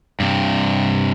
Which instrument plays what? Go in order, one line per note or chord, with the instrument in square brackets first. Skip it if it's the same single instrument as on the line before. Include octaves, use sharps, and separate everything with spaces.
[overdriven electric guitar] G2 C3